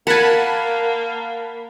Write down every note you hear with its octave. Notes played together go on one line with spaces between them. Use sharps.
A#3 A#4 F#5 G#5 A5 B5